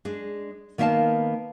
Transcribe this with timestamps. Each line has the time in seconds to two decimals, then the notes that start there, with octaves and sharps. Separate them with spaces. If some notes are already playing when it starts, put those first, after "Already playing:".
0.05 G#3 D4
0.78 D#3 A#3 B3 E5 F5 A5